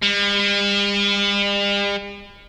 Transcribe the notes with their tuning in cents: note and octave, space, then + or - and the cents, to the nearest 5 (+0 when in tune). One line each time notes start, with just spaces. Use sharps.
G3 +45